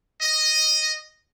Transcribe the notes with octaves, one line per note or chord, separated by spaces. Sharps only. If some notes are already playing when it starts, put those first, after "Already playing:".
D#5